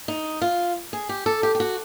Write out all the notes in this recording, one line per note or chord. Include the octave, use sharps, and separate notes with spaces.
D#4
F4
G#4
G4
A4
G4
G4
F#4